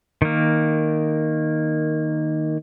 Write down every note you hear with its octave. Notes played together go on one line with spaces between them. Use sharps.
D#3 A#3